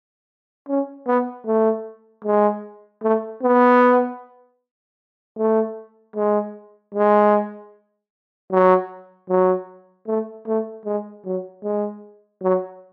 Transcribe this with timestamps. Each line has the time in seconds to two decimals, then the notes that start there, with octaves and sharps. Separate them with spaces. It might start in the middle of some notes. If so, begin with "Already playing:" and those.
0.68 C#4
1.07 B3
1.46 A3
2.24 G#3
3.03 A3
3.42 B3
5.37 A3
6.16 G#3
6.94 G#3
8.51 F#3
9.29 F#3
10.07 A3
10.47 A3
10.85 G#3
11.25 F#3
11.64 G#3
12.42 F#3